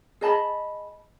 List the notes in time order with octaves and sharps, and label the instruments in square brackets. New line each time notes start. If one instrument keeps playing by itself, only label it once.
[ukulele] G#4 D#5 A5 B5